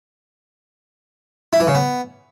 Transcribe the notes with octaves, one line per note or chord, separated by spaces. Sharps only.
E4
E3
C#3
B3